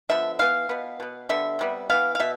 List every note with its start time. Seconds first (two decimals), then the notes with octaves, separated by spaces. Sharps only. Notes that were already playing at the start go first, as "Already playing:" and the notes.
0.09 D3 F3 B3 E5
0.39 E3 B3 F5
0.69 B2 B3
1.00 B2 B3
1.29 D3 G3 B3 E5
1.59 C3 G3 B3
1.90 E3 B3 F5
2.15 F5
2.20 B2 E5